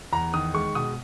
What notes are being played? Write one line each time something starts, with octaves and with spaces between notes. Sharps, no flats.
E2 A#5
D#3 D#6
G#3 C#6
B2 D#6